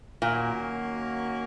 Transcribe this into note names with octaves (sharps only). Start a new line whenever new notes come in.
A#2 D#3 F#3 A#3 C#4 F#4